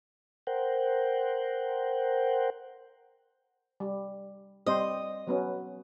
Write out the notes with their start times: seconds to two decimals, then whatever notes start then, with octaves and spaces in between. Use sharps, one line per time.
0.47 A#4 C5 F#5 G5
3.80 G3
4.66 G3 C4 C5 D#5
5.27 F#3 B3 C#4